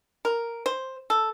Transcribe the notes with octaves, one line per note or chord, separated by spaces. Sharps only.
A#4
C5
A4